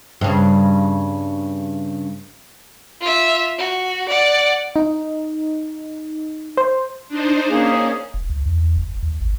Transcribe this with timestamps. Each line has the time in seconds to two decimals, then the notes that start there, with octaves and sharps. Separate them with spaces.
0.21 G2 C#3
3.01 F4 E5
3.58 F#4
4.09 D5 F#5
4.76 D#4
6.57 C5
7.08 D4 D#4 C5
7.50 A#3 C#4 G#4
8.14 F1
8.30 C#2
8.46 E2
8.77 F#1
9.03 D#2
9.20 G#1